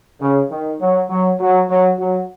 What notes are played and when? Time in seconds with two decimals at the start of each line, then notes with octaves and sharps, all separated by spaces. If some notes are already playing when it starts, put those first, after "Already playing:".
0.21 C#3
0.51 D#3
0.80 F#3
1.10 F#3
1.40 F#3
1.70 F#3
1.99 F#3